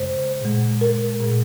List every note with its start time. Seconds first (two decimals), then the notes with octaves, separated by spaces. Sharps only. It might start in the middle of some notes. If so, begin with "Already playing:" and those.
Already playing: F#2 C#3 G#3 C5
0.42 A#2 G#3
0.81 A#4
1.20 A#2 G#3